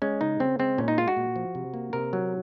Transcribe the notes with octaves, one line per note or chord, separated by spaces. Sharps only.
G#3 C#4
C#3 D#4
C#3 C4
G#3 C4
A#2 C#4
D#4
G#3 F4
F#4
A#2
F3
C3
A#3
C3 A#4
F#3